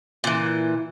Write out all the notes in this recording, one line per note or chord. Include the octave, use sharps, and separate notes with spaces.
A#2 E3